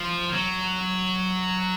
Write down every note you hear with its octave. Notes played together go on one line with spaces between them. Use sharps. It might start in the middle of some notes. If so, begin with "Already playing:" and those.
Already playing: F3
F#3